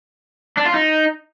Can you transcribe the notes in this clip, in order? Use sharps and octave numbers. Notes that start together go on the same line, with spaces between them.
D4
F4
D#4